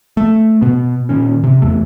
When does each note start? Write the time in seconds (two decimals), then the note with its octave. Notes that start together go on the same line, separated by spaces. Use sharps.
0.17 A3
0.61 B2 B3
1.09 A#2 D#3 C#4
1.43 C3
1.62 E2 A3